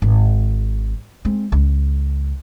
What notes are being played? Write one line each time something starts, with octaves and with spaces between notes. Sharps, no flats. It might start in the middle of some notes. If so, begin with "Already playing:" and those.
G#1
G#3 C4
C#2